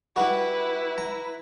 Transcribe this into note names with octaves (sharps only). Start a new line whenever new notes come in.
G3 E4 F#4 B4
A#5